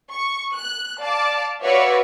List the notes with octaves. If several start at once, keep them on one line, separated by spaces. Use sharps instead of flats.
C#6
F#6
D5 F5 A5 D6
F#4 B4 C#5 D5 E5 F5